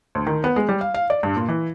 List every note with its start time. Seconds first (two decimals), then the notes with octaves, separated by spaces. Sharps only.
0.15 D2
0.27 D#3
0.44 B3
0.56 G#3
0.69 G3
0.81 F5
0.94 F5
1.10 D5
1.23 G2
1.36 A#2
1.48 E3